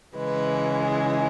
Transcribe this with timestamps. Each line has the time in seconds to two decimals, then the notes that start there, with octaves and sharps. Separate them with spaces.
0.15 C#3 E3 G#3 B4
0.86 G#4